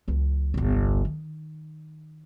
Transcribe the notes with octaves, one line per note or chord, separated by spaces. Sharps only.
C#2 E3
G1 C2
D#3